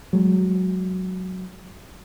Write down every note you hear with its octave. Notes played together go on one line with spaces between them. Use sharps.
F#3 G#3